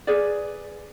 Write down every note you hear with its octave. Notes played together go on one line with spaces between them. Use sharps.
G#4 B4 D5